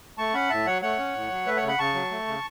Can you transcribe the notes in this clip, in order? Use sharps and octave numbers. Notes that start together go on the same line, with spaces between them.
A3 A5 C#6
C#4 F#5 B5
A2 E5 A5
F#3 C#5 F#5
A3 C#5 F#5
C#4
A2
F#3
A3 B4 E5
C#5 F#5
C#3
F#5 B5
C#3 A5 C#6
F#3
A3
C#3